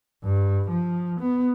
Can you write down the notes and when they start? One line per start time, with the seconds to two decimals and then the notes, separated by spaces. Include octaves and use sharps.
0.24 G2
0.69 F3
1.20 B3